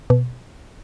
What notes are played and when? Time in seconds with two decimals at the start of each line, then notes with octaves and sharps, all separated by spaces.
0.10 B2